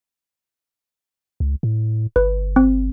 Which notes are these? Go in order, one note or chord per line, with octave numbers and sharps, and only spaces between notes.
C#2
A2
G1 B4
C4